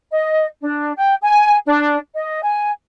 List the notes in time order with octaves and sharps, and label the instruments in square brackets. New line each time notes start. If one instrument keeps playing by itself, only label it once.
[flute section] D#5
D4
G5
G#5
D4
D#5
G#5